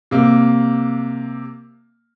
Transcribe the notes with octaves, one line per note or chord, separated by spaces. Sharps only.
C3 A#3